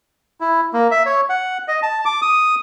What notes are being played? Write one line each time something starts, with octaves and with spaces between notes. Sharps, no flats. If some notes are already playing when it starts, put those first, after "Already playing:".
E4
A#3
E5
C#5
F#5
D#5
A5
D6
D#6